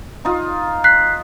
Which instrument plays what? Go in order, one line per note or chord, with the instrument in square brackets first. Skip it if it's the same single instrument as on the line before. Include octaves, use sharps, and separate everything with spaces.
[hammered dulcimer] D#4 F4
[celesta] F#6 B6 C7